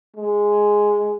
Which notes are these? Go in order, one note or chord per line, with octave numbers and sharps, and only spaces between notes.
G#3